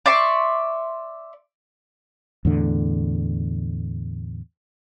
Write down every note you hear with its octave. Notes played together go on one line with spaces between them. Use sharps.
D5 E5 C6 C#6
E2 A2 D3